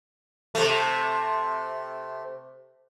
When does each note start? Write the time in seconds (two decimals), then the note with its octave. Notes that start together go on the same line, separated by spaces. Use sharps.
0.55 C3 A3